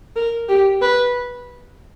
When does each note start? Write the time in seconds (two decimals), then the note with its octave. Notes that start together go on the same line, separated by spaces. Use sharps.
0.16 A#4
0.49 G4
0.82 B4